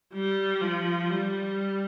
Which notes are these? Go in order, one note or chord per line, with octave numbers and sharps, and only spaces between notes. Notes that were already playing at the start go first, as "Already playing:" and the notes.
G3
F3
G3